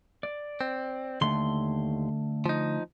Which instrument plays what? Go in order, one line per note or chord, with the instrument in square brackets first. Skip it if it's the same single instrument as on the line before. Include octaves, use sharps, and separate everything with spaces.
[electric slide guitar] D5
[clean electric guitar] C4
[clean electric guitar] D#2 C6 [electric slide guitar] D3 A3
[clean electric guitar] F3 D#4